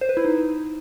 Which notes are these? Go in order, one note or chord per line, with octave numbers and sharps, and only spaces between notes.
C5
B4
E4
D#4